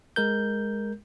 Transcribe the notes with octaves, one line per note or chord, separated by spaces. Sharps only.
G#3 A#4 G6